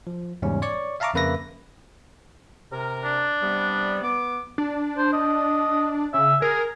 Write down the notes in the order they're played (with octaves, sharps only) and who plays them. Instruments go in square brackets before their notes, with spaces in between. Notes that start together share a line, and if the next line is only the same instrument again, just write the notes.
[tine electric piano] F3
E2 G#2 C#3 G3 C#4
C#5 D5 C#6
E5 F5 A5 A#5 C#6 D6
F2 C#3 A#3 B4 E5 A#6
[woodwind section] C3 A#4
[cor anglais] D4
[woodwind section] C3 G3 B3
B3 D6
[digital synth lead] D4
[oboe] C5
D#5
[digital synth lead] C#3 [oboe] E5
[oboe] G#4 [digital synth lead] A#4